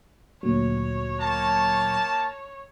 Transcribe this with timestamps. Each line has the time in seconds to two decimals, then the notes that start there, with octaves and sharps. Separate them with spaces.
0.43 D2 A#2 F#3 C#5
1.20 A#3 A5